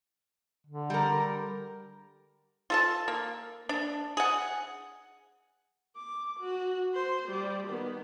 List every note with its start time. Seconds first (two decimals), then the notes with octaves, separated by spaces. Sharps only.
0.67 D3
0.90 G3 A#4
2.70 F4 A4 A5
3.08 A#3
3.69 D4
4.17 G#4 F#5
5.96 D6
6.40 F#4
6.94 C5
7.29 G3
7.67 D#3 B3